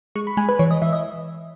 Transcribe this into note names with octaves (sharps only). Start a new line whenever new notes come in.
G#3 C#6
B5
G#3 G#5
B4
E3 C#5
D#5
E3 E5
D#5